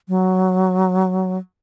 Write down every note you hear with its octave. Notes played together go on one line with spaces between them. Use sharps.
F#3